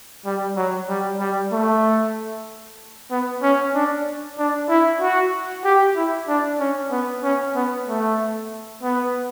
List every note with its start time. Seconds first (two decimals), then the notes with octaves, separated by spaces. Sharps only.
0.25 G3
0.56 F#3
0.89 G3
1.20 G3
1.53 A3
3.11 B3
3.42 C#4
3.75 D4
4.38 D4
4.69 E4
5.01 F#4
5.64 G4
5.96 E4
6.28 D4
6.60 C#4
6.91 B3
7.23 C#4
7.55 B3
7.87 A3
8.83 B3